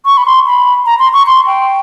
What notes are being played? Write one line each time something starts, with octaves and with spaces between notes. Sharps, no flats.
C#6
B5
C6
B5
A#5
C6
C#6
C6
G5